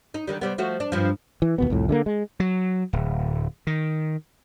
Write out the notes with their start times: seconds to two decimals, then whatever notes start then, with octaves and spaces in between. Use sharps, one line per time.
0.14 D#4
0.27 D3 D#3 G3
0.41 C3 G3 B3
0.58 F3 A3 F#4
0.80 D4
0.92 G2 F3
1.42 E3
1.58 D#2 B2 B3
1.70 C2 F2 A2
1.89 D3 G#3 A#3
2.06 G#3
2.40 F#3
2.93 D1
3.67 D#3